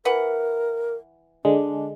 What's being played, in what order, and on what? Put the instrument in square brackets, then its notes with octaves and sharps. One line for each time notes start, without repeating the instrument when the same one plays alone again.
[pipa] E3 B4 F#5 [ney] A#4
[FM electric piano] D3 G#3 [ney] D4